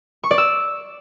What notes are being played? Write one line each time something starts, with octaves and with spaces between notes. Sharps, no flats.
C#6
D5
E6